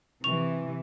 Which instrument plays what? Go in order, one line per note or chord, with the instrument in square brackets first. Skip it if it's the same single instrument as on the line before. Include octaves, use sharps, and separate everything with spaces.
[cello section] C3 E3 [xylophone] C#6 F7